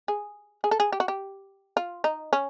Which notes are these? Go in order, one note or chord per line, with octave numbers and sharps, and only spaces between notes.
G#4
G#4
A4
G#4
G4
F#4
G4
F4
D#4
C#4